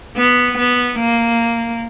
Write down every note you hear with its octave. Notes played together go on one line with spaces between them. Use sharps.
B3
B3
A#3